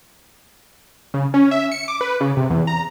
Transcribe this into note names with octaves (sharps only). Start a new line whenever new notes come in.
C#3
C#4
E5
C#7
D6
B4
C#3
C3
E2
A#5